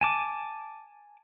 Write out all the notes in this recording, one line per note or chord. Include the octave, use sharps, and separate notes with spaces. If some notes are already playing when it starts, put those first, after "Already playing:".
G#5 A5 D6